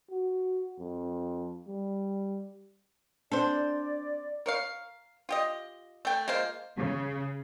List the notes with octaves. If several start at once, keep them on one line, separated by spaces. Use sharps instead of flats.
F#4
F2
G3
C4 D4 A4 C5 D5
A#4 C#5 F5
F4 G4 D#5
A3 G5
G#3 A#3 F4 C5
C#3